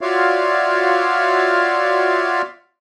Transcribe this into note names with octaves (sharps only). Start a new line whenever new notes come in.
F4 F#4 C#5 D5 E5 F5